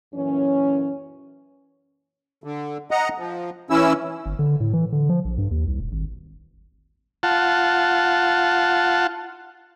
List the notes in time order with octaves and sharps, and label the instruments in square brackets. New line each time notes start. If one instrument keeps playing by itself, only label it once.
[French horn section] F#2 A#2 E3 C#4
[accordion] D3
D#5 F#5 A#5
F3
E3 C#4 E4 E6
[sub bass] G1
D3
A2
E3
D3
F3
A#1
G2
D#2
C2
D#1
G#1
[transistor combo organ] F4 F#5 A5